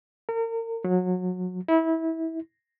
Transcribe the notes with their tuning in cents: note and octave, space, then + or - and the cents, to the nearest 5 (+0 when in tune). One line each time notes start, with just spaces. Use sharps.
A#4 -35
F#3 -25
E4 -25